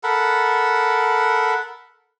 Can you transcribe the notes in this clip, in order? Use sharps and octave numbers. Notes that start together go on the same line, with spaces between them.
A4 A#4 F#5 B5